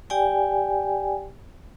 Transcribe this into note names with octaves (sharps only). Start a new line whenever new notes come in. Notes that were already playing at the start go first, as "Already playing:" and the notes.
G4 D5 G5 G#5